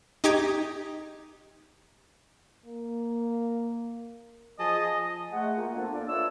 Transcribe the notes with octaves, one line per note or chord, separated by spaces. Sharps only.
D#4 G4 D6 G#6
A#3
F3 G#4 D#5 A5
G#3 A3 F#5
A#3 F4
A#2 F3 A#3 B3 D4 A4
D4 F4 A4 D5
D4 E4 F4 B4 C#5 E6